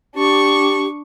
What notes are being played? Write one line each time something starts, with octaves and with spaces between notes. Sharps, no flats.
D4 G4 C#6